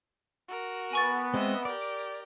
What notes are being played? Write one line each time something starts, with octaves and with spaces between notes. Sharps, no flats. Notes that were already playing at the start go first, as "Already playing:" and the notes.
F#4 A#4
B3 G#5 C#6 A6
G#3 C4 D#5 E5
G4 A#4 D5